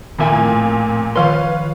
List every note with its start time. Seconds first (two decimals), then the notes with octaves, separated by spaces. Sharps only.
0.19 F2 A#2 D#3 E5 G5 G#5
0.32 A2
1.16 D#3 F3 B4 C#5 F5 C6